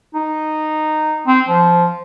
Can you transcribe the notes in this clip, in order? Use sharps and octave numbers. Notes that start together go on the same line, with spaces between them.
D#4
C4
F3